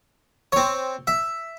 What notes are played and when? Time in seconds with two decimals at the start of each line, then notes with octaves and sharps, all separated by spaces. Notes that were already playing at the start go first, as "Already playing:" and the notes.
0.52 C4 C#5
1.07 E5